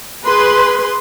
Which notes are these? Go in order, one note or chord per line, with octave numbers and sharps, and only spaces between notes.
G#4 B4 C6